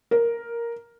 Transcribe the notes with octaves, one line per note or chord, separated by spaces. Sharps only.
A#4